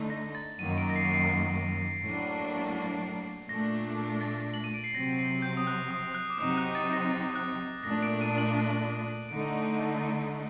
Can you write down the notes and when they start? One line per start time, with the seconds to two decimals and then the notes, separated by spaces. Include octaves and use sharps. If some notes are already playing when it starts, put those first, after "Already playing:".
Already playing: D3 A3 D#4
0.10 A#6
0.35 A6
0.59 F#2 D#3 F#3 A#3 D#7
0.78 D7
0.90 A#6
0.96 C7
1.14 C7
2.04 A2 F#3 A#3 D4
3.49 A#2 A3 D4 A#6
4.21 A6
4.54 F#7
4.64 D#7
4.74 D7
4.84 C7
4.94 C3 F#3 C4 A#6
5.19 C7
5.42 G6
5.57 D#6
5.67 F#6
5.91 D#6
6.15 F#6
6.30 D6
6.39 C3 F#3 C4 D#4 D#6
6.58 F#6
6.75 A6
6.93 A#6
7.11 A6
7.35 F#6
7.84 A#2 A3 D4 A#6
8.03 D7
8.21 D#7
8.38 F#7
8.49 D7
8.57 D#7
9.29 D3 A3 D#4 D7